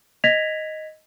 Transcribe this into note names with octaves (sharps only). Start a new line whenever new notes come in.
D#5 G#6 A#6 B6 F7